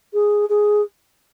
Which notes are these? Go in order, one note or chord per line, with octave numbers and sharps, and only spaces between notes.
G#4
G#4